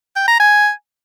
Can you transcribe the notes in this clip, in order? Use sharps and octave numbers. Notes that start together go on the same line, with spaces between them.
G5
A#5
G#5